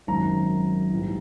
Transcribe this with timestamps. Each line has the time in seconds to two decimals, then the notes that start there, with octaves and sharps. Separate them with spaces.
0.07 G#1 F#2 D#3 F#3 A#5
0.91 A#1 G#2 E3 G3